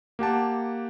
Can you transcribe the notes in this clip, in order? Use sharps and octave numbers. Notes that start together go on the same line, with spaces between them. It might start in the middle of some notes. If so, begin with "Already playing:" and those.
A#3 G4 F#5 A5